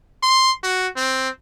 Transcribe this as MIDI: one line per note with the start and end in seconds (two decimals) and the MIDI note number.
0.23 0.52 84
0.63 0.88 66
0.96 1.29 60